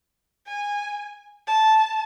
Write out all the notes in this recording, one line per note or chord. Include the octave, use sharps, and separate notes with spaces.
G#5
A5